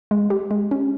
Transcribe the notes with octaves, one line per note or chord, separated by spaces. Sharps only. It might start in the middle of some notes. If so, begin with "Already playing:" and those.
G#3
G4
G#3
C#4